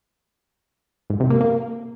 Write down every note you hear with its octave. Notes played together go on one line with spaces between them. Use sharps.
G#2
C3
A#3
A#3